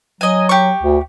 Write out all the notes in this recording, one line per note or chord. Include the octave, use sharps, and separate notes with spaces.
F#3 D#5 G#5
G4 C#6
D2